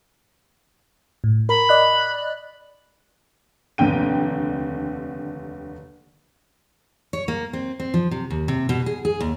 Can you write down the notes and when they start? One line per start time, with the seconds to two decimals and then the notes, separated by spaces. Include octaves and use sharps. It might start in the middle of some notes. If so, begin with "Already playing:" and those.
1.24 A2
1.49 A#4 B5
1.69 D5 D#5 F#6
3.78 F1 D#2 D3 G5 D#7
7.13 C#5
7.28 A#3
7.53 C4
7.80 C4
7.94 F3
8.11 C3
8.30 D#2
8.48 C3
8.69 B2
8.86 G#4
9.05 G#4
9.21 D#2